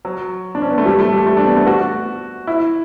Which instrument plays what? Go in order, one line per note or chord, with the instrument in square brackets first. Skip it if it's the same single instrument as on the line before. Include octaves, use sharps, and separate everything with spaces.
[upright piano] F#3
D4
C#4
B3
A3
G3
A3
G3
A3
D4
B3
A3
F#4
E4